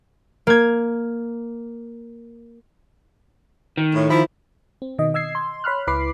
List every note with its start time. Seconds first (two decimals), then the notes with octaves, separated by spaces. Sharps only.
0.47 A#3 G#6
3.77 D#3
3.94 A2
4.08 F3 E4
4.82 C4
4.99 B2 D#3 D#5
5.14 D#5 E6 G#6 C7
5.35 C6
5.64 C#5 B5 C6 F6 F#6
5.87 C#2 E4 B4 B5 D6 C7